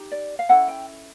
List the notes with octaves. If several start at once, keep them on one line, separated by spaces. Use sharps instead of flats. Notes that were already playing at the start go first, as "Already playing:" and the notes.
Already playing: D#4 G4
D5
F5
C#4 E4 A4 F#5
G5